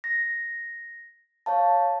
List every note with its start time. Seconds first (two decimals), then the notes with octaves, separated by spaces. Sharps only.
0.04 A#6
1.46 C#5 F5 A5